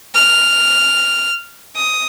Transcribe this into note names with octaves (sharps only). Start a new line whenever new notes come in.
F6
D#6